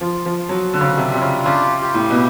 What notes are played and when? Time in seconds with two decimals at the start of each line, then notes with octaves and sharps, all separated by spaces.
0.01 F3 F4
0.26 F3
0.38 F4
0.49 F#3
0.73 D3 D4
0.81 C#3
0.88 D3
0.97 C3
1.09 C3 F4
1.21 C#3
1.46 C#3 G4
1.82 G4
1.94 A2
2.10 B2